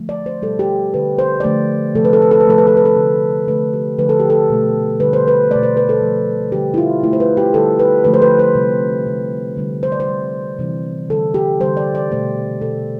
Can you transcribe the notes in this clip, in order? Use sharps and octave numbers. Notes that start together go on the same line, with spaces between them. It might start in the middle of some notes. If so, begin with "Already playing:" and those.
Already playing: D3 F3 A3
D5
C5
B2 G3 A4
G4
D3 A3 B4
C5
D5
D3 F3 A3 C5
C3 F3 A3 A4
B4
A4
B4
A4
B4
C3 F3 A3 A4
B4
A4
B4
A4
D3 A3
D3 A3 B4
G4
D3 F3 A3 B4
A4
G4
A4
B2 A3
D3 G3 B4
C5
B4
B2 A3 D5
C5
B4
A4
D3 F3 A3
D3 G3 G4
E4
F4
D3 A3 E4
C5
B4
G4
D3 G3 A4
B4
D3 F3 A3 B4
C5
B4
C5
C3 G3
C3 G3
D3 G3
C5
D5
C5
D3 G3
C3 E3 G3
D3 G3 A4
G4
D3 G3 C5
D5
D5
B2 A3 C5
B2 G3 A4